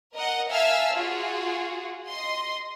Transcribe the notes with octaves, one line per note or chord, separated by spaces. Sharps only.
A#4 D#5 F#5
E5 F5 G#5 A5 E6 F6
F4 F#4 G#4
D#5 C6